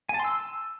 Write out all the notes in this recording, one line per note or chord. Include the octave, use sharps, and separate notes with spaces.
G#5
A5
C6
E6